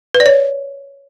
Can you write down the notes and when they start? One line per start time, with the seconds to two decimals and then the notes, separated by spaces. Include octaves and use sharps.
0.15 B4
0.20 D5
0.26 C#5